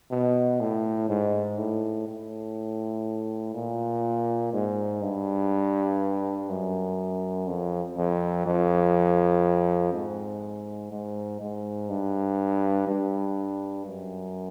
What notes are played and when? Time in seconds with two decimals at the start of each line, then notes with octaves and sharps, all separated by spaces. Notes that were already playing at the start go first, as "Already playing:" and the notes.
0.11 B2
0.61 A2
1.09 G#2
1.58 A2
2.08 A2
3.55 A#2
4.53 G#2
5.02 G2
6.49 F#2
7.47 F2
7.97 F2
8.46 F2
9.93 G#2
10.92 G#2
11.41 G#2
11.89 G2
12.87 G2
13.87 F#2